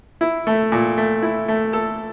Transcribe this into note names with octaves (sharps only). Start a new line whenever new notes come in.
E4
A3
A#2
A3
E4
A3
A4